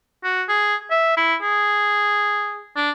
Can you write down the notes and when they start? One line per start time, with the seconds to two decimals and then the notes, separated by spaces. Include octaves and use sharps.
0.24 F#4
0.49 G#4
0.91 E5
1.17 E4
1.42 G#4
2.76 D4